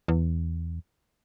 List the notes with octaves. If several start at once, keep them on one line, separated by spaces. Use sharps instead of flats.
E2